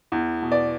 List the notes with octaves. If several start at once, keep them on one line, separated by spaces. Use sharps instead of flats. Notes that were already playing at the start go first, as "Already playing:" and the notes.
E2
B2
D5